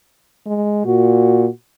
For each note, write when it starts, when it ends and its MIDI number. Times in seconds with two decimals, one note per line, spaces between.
0.46 0.83 56
0.86 1.47 46
0.86 1.49 66